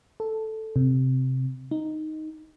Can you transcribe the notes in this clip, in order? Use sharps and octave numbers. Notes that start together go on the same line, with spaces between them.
A4
C3
D#4